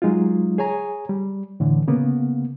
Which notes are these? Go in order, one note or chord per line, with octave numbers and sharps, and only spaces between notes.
F#3 G#3 D#4 F4
G#4 C#5 G#5 A#5
G3
A2 D3 E3
C#3 A#3 B3